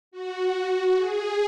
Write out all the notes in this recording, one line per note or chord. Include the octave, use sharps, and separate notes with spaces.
F#4
G#4